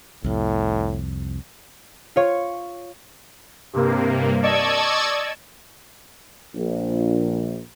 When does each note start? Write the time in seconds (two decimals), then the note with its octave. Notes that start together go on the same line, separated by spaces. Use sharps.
0.24 C2 F2 A2
2.16 F4 C#5
3.73 G2 C3 A#3
4.42 D5 D#5 A5 C#6 E6 G#6
6.56 A#1